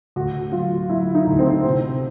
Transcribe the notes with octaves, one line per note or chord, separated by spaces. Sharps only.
D2 F#4
F#3 F4
F#3 E4
D#4
D2
C4
C3